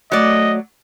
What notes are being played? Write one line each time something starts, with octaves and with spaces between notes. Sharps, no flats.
F#3 A3 D5 D#5